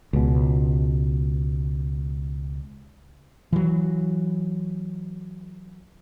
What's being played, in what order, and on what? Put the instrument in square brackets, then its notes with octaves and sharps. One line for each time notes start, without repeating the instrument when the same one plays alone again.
[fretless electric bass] C#2 B2
E3 F#3